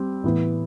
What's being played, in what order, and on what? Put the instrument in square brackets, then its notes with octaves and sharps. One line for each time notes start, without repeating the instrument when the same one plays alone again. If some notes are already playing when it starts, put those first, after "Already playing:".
Already playing: [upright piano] G3 C4
A2 E3 B3